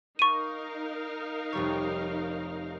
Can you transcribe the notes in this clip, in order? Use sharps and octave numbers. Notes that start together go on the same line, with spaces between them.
D#4 A#4 F5 C#6 D#7
F1 G3 C#5